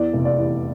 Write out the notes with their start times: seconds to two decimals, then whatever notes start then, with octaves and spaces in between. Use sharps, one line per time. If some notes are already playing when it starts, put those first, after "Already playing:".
Already playing: E2 D5
0.13 F1
0.25 D5
0.38 E3